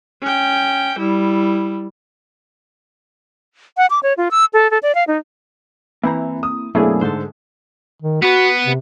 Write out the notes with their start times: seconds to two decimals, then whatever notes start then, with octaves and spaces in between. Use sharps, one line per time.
0.22 C#4 G5
0.99 G3 E4
3.77 F#5
3.90 D6
4.03 C#5
4.17 F4
4.31 E6
4.53 A4
4.71 A4
4.83 D5
4.95 F5
5.08 D#4
6.03 E3 A#3 C4 E4 A#5
6.43 D#6
6.75 F#2 B2 A3 A#3 C4 D4 E4 G#4
7.01 G#2 D3 A4 C5
8.03 D#3
8.22 B3 F#4 B4
8.66 C3